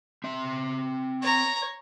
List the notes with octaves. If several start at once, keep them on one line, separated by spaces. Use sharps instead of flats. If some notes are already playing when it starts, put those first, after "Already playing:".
C4 E5
C#5 A#5